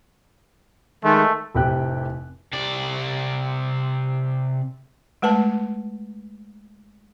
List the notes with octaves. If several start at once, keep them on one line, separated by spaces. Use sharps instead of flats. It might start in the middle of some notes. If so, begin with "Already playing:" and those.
D#3 G#3 A3
F1 A2 C3 G4 G5 F#6
C3 D5
G#3 A3 B4 A5